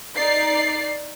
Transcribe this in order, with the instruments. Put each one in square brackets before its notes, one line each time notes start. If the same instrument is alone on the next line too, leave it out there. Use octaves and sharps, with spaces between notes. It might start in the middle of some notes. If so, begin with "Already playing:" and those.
[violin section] D#4 D5 C7